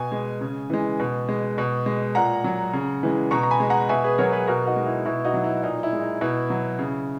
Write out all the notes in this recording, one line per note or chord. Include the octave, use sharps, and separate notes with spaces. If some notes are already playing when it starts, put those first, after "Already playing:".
Already playing: B2 G#5
G#3
C#3
E3 G#3
B2
G#3
B2
G#3
A#2 F#5 A#5
F#3
C#3
E3 G#3
B2 A#5 C#6
A#5
G#5 B5
G#3
F#5 A#5
B2 E5 G#5
G#4 B4
F#3 A#4 C#5
G#4 B4
B2 F#4 A#4
D#4 F#4
G#3
E4
B2 E4
D#4 F#4
F#3
E4
A#2 D#4
E4
G#3
D#4
B2 E4
F#3
C#3